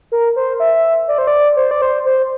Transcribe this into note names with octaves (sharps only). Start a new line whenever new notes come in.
A#4
C5
E5
D5
C5
D5
C5
D5
C5
C5